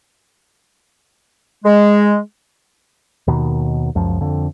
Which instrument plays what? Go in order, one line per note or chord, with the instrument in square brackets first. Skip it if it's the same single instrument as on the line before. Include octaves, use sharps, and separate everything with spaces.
[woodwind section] G#3
[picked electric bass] D#2 B2 D#3
C#2 F#2 F3
F2 D3